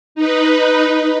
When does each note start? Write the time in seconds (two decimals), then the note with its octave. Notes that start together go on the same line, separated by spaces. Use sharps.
0.15 D#4 B4